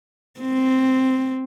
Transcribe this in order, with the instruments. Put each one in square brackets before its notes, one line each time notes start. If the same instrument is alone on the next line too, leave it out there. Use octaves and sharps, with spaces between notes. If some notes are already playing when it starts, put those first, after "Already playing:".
[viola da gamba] C4